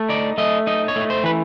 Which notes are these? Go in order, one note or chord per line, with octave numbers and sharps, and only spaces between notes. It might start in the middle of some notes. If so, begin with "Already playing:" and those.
Already playing: A3
D#4 D5
A3 D#5
D#4 D#5
C#5
A3
C5
E3 B4